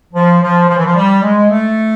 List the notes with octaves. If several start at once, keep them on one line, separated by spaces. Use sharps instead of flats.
F3
F3
F3
E3
F3
G3
G#3
A3